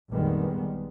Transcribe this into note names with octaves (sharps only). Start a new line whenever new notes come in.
A#1 F2 D#3 G3 G#3 B3